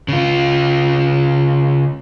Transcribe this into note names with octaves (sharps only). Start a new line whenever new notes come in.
C#3 F4